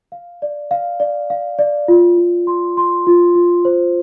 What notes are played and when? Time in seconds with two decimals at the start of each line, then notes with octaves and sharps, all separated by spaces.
0.12 F5
0.42 D5
0.71 F5
1.00 D5
1.30 F5
1.59 D5
1.88 F4
2.17 F4
2.47 C6
2.77 C6
3.07 F4
3.35 F4
3.65 C5